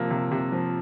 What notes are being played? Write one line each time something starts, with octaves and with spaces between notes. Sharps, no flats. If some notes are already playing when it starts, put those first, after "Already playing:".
Already playing: C3 F3 A#3
C3
C3
F3